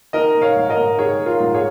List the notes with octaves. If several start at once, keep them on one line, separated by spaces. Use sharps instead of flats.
D#3 A#4 D#5
D#3
C#5 F5
G#2
A#4 D#5
G#2
D#3 G#4 C#5
D#3
F4 A#4
G#2
G#4 C#5